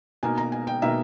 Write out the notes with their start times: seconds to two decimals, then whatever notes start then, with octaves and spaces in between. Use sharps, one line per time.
0.23 B2 A#3 D#4 G#5
0.38 A#5
0.52 G#5
0.67 G5
0.82 B2 A#3 D#4 E5